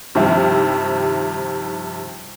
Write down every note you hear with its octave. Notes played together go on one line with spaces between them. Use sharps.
G2 C3 D#3 F3 G3 E4